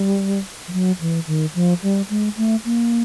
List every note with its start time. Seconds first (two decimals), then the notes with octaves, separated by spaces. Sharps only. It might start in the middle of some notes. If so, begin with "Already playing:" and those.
Already playing: G3
0.68 F3
0.73 F#3
1.01 E3
1.27 D#3
1.55 F3
1.83 G3
2.10 G#3
2.37 A3
2.65 A#3